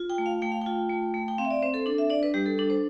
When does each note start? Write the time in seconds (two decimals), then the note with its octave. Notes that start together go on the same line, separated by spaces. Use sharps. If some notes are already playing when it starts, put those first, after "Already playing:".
Already playing: F4
0.10 G5
0.18 A3
0.26 F5
0.42 A3 G5
0.52 F5
0.61 F4 G5
0.89 A3
1.14 A3
1.28 G5
1.38 C4 F5
1.45 E5
1.51 D5
1.62 C4 C5
1.74 A4
1.86 D4 A4
1.98 E5
2.10 D4 D5
2.23 B4
2.34 G3 G4
2.46 A4
2.58 D4 A4
2.70 C5